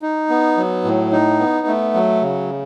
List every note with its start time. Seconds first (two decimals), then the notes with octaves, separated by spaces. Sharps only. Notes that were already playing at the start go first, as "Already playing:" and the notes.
0.02 D#4
0.29 B3
0.57 F#3
0.85 A2
1.12 D#4
1.39 B3
1.67 A3
1.94 F#3
2.22 C#3